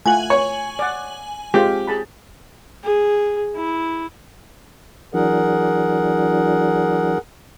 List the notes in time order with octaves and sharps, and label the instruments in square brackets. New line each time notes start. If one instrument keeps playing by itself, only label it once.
[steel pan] A3 F4 F#5 [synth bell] G#5 F#7
[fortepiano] C#5
[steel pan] D5 F#5
[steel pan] G#3 C4 F4 [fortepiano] G4
[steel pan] G#4 A5 B5
[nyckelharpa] G#4
E4
[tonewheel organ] E3 F#3 D4 [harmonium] G#4 A#4 F#5